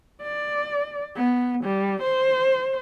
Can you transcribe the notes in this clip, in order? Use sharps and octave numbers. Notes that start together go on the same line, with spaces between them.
D5
B3
G3
C5